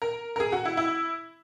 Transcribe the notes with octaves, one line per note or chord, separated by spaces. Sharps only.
A#4
A#4
G#4
F#4
E4
E4